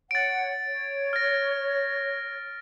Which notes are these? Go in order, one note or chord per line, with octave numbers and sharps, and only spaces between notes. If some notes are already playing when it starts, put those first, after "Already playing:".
C#5 F#5 A6 D7
C#5
F6 A#6